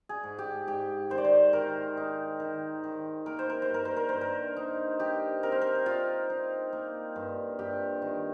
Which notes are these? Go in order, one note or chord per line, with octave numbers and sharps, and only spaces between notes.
G#4
G#2
G4
G#2 G4
D#3 C5
D5
C5
D#3 A#4
D#4
D#3
D#3
A#3 A#4
C5
A#4
C5
G2 A#4
C5
A#4
G2 C5
A#4
D#4
D#4 G4
C4 A#4
C5
A#4
D#4 F4
D#4
A#3
G2
G2 G4
D#3